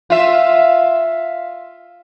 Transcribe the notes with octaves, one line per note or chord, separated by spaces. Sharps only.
F4 E5